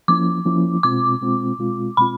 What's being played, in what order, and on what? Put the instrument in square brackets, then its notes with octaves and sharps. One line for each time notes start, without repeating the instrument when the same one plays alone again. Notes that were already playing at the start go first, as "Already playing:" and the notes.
[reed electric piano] F3 A#3 C#4 E4 [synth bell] D6
[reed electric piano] F3 A#3 C#4 E4
[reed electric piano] B2 G#3 C4 F4 [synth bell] D6
[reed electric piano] B2 G#3 C4 F4
B2 G#3 C4 F4
[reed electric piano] B2 G#3 C4 F4 [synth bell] B5